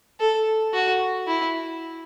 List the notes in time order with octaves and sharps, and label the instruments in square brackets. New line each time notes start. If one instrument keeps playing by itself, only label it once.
[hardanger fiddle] A4
F#4
E4